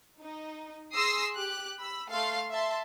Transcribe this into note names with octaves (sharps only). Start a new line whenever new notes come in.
D#4
G#4 C6 D#6 E6 A#6 C7
G4 F#6
B5 E6
A3 A4 F5 C6
E5 A5 C6